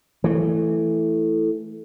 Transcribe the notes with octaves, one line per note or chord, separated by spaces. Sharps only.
E3 A3